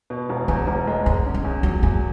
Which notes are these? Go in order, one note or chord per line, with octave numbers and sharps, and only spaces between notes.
B2
E1
E2 C#4
E1
G#3
E2 C#4
C#4
D4
E2
F#3 D4
E2 C#4